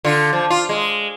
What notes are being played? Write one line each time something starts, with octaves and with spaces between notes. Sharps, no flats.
D3 F4
F3
F4
G#3